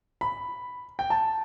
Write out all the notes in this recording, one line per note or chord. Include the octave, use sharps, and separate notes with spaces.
B5
G5
A5